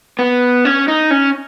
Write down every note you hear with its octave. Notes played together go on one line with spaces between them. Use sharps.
B3
C#4
D#4
C#4